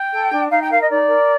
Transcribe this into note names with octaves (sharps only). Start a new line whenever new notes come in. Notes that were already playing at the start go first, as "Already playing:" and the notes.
Already playing: G5
A4
D4
D#4 F5
G5
A#4 F5
D#5
D#4 D5
A#4